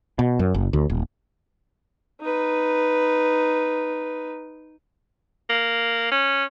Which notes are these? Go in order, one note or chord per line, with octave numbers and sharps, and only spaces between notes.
B2
F#2
F#1
D2
D#1
D#4 B4
A#3
C#4